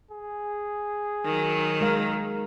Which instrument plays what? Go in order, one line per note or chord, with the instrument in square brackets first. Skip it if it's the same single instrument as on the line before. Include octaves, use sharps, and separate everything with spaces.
[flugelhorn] G#4
[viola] D#3 F#3
[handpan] G#3 A#4 F5